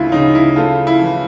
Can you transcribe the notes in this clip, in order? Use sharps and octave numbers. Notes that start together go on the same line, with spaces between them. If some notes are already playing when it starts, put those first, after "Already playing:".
Already playing: D2 C#3 E4 F4
C#3 D#4
E4
A3 F4
E4
E3